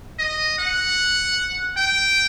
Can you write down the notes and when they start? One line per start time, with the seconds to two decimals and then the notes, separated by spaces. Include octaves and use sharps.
0.19 D#5
0.58 F#5
1.77 G5